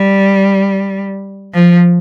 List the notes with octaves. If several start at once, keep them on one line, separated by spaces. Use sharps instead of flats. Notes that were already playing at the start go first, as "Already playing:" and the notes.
Already playing: G3
F3